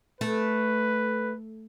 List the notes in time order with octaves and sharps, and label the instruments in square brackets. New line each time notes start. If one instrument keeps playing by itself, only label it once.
[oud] A3 [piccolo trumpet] B4